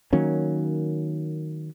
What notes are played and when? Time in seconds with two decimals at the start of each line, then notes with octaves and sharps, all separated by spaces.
0.13 D#3 F#3 A#3 C#4